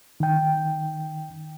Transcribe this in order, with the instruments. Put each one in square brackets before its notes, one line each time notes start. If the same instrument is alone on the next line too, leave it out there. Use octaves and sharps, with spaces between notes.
[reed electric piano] D#3 G5